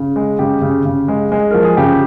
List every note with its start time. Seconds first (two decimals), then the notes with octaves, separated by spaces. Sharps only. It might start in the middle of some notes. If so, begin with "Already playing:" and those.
Already playing: C#3
0.16 G#3
0.39 C#3 G4
0.62 C#3
0.85 C#3
1.08 G#3
1.32 G#3
1.51 F3 A#4
1.64 G#4
1.77 C#3 G4